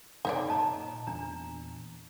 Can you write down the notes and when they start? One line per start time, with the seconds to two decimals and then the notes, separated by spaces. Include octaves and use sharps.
0.25 F#2 C3 D#4 C#5 D5
0.48 A#2 A#3 D#5 A5 A#5
1.07 E2 A#2 D4 A#5